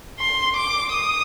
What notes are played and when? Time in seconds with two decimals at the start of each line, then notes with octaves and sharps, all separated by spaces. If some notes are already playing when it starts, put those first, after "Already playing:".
0.19 C6
0.56 D6
0.93 D#6